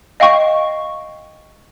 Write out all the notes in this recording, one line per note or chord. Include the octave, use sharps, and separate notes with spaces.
D#5 F5 G5 C#6